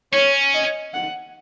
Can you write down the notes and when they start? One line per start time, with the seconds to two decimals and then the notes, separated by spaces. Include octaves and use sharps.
0.13 C#4 C#5
0.54 D#5
0.94 F#5